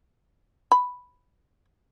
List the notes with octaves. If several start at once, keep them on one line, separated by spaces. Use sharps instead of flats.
B5